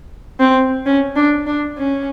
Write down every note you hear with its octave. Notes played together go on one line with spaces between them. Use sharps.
C4
C#4
D4
D4
C#4